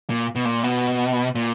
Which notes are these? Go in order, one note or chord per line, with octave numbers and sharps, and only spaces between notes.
A#2
B2
A#2
B2
A#2